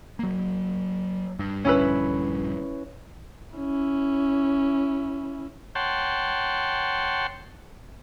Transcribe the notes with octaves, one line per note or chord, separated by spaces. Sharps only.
F#3 A#3
G2
A#1 G2 D3 C#4 E4 B4
C#4 E4
C#5 F#5 G5 A5 C6